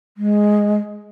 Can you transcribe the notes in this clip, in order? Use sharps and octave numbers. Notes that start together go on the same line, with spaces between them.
G#3